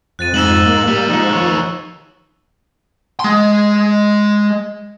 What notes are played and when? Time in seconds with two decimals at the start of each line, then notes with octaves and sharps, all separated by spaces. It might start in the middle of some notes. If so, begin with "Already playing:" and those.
0.19 F2 F#6 A6 D#7
0.34 G#2 E6 E7 F#7
0.66 A#3
0.87 G3
1.10 F3 G#3 D#4
1.33 D#3 C#5
3.20 G#3 C6